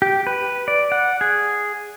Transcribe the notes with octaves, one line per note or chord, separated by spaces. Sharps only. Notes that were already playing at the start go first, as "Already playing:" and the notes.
G4
B4
D5
F#5
G#4